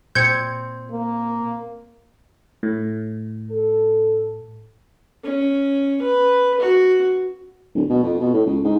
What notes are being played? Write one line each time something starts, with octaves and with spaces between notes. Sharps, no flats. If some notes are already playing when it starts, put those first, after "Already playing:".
A#2 C4 G6 G#6 C#7
A#3
A2
A4
C#4
B4
F#4
D1
B2
F2
B2
A2
C#2
G#2